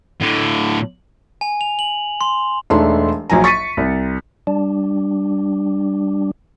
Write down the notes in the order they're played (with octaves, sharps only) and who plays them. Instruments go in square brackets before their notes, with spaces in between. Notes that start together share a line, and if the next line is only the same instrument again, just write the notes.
[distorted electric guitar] A2 D3
[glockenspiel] G#5
F7
F#7
C6
[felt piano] E1 A3 D4 D#4 C6
A#1 F#3 G#5 A#5
C#6 A6 B6 C#7 D#7
C2
[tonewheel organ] G3 D4